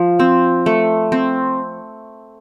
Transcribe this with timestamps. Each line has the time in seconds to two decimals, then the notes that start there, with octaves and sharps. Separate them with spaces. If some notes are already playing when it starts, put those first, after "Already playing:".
Already playing: F3
0.19 C4
0.66 A3
1.12 C4